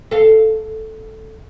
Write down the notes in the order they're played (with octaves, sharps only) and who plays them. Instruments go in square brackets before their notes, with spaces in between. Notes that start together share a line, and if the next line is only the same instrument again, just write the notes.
[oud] A4 F5